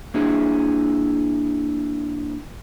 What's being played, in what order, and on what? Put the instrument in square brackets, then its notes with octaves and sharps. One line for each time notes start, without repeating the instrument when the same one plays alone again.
[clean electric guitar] A#3 D4 E4 G#4 E5